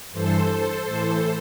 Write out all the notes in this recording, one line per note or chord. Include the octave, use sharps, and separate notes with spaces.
G2 E3 A4 C5
A4 C5
A2 E3